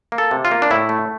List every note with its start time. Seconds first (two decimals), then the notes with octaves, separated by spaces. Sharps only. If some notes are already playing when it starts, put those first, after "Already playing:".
0.12 A#3
0.18 A4
0.31 C3
0.45 F4
0.51 A#3
0.62 D4
0.71 A2 E4
0.89 A3